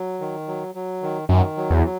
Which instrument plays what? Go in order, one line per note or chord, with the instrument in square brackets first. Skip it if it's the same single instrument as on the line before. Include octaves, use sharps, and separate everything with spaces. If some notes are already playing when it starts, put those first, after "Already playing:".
Already playing: [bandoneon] F#3
D#3
F#3
F#3
D#3
[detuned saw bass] F#2 [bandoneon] D#3
[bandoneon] F#3
[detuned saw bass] E2
[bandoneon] F#3